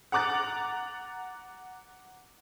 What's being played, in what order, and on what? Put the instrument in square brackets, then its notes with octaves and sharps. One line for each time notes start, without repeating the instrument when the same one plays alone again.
[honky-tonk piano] F#5 A#5 D6 F#6 A6